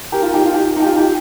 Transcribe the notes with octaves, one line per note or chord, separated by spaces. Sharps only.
G4 A#4
F4
D#4 G4
F4
D#4 G4
D#4
G4
F4
D#4 G4